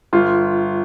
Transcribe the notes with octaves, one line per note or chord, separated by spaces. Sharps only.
G1 F4